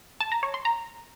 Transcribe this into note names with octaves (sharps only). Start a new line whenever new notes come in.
A5
A#5
C#5
C6
A#5